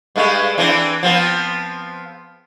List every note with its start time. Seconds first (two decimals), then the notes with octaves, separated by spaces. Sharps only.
0.16 G2 G#3 A3
0.58 E3 C4 D4
1.03 F3 B3 C4